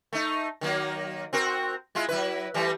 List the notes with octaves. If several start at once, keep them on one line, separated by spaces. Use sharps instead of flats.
A3 D#4
D#3 F#3 A#3
C4 F#4 A#4
G#3 E4 F4
F#3 E4 B4
E3 G3 A3